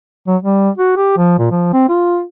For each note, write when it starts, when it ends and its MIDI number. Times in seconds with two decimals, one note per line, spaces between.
0.28 0.37 54
0.43 0.70 55
0.78 0.94 66
0.96 1.15 67
1.17 1.35 53
1.39 1.48 46
1.51 1.69 53
1.73 1.88 60
1.89 2.23 65